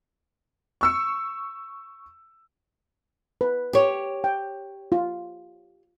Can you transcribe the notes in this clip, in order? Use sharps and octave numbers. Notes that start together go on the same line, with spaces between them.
C#6 E6 C#7
B4
G4 C#5
G5
F4